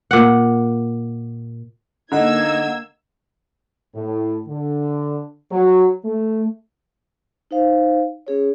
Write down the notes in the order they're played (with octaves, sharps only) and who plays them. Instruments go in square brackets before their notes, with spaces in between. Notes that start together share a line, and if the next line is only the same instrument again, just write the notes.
[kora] A#2 F#5
[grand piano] D3 [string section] A#3 E6 G#6 [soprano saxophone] D#4 [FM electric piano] D#5 F#5 A#5
[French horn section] A2
D3
F#3
A3
[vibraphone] D#4 C5 F5
C#4 G#4 C#5